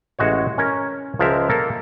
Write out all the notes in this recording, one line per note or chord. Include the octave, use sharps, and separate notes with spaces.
A1 G#3 F#4 C#5
C#4 A#4 C#5
C#2 F3 G#3 A#4 E5
A#3 A4 A#4